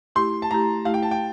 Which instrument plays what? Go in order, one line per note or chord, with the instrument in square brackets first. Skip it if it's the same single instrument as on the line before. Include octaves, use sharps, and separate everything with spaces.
[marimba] A3 E4 G4 [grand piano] C6
[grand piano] A5
[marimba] A3 E4 G4 [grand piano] A#5
[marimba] A3 E4 G4 [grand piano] F5
[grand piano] G5
A5
G5